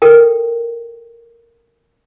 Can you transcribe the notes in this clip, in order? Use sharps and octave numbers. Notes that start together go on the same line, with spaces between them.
A4 A#4 G5